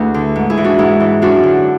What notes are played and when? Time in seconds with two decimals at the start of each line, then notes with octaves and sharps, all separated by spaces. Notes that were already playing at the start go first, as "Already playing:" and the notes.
Already playing: D2 E4 G#4 B4
0.14 D3
0.36 G#2
0.50 E4 G#4
0.57 E3
0.64 D4 F#4
0.79 G#2 E4
1.00 E3
1.22 F#2 D4 F#4
1.43 D3